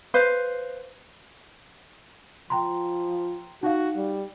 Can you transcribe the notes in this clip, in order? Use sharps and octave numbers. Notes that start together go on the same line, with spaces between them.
B4 C5 F5
F3 G5 A#5 C6
D#4 F#4 F5
G3